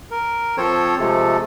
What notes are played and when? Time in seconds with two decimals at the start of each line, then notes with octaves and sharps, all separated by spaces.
0.11 A#4
0.57 F3 C4 A4 C5 C#5
0.99 C3 F3 G#3 A3 A4